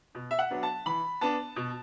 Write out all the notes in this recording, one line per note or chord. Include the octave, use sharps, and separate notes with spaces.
B2
E5
F#5
F#3 B3 D4
A5
E3 B5
B3 D4 A5
B2